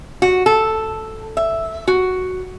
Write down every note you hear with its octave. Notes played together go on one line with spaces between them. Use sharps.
F#4
A4
E5
F#4